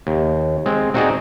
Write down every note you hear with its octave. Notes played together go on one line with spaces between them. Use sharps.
D#2
G#3 C4
C4 D#4 F#4 G#4 D5 D#5